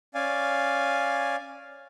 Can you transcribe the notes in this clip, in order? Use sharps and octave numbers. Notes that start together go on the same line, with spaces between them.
C#4 D5 F5 G#5